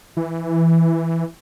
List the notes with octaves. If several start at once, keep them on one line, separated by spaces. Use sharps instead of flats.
E3